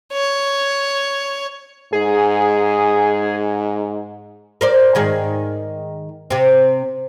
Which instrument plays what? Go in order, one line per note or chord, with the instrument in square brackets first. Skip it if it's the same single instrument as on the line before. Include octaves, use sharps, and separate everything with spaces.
[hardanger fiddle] C#5
[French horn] G#2 [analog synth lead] G#4
[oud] A#4 C5 D5
G#2 D#3 G#4
C3 C4